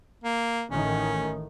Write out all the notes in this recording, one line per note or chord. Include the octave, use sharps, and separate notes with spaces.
A#3
A1 A2 D#3 C#4